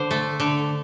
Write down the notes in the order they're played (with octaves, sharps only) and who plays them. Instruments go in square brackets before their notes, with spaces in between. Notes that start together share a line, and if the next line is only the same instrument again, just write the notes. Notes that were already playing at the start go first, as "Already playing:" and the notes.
Already playing: [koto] D3 C5
A3
D3